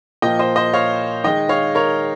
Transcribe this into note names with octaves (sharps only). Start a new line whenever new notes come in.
A#2 F3 A#3 D#5 G5
C5 D#5
C5 D#5
C#5 F5
D#3 G#3 D#5 G5
C#5 F5
A#4 C#5